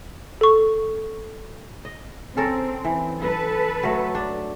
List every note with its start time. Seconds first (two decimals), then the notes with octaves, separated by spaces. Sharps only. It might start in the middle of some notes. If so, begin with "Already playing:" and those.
0.41 A4 C#6
1.85 D#5
2.37 C4 C#4 A4 A#4
2.85 E3
3.20 A4 B4
3.83 F#3 A3
4.15 D4